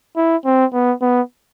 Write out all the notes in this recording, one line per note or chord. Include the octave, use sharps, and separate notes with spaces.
E4
C4
B3
B3